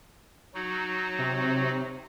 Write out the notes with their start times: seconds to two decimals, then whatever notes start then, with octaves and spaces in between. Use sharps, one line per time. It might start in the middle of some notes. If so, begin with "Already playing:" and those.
0.54 F#3 D#4 F#4
1.19 C3